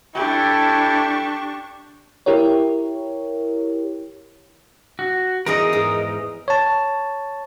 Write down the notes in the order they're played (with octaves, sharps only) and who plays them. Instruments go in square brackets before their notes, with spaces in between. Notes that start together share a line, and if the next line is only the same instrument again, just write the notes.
[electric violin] D4 C#6 [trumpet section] E4 A4 [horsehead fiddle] G4
[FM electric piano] E4 G4 A#4 C#5
[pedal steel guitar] F#4
[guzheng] E2 D#4 G#4 [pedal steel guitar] A#4 D#5
[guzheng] G#2
[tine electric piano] C#5 A5